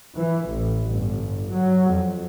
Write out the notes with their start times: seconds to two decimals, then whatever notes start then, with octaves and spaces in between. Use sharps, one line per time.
0.17 E3
0.49 A1
0.88 G1
1.52 F#3
1.92 F2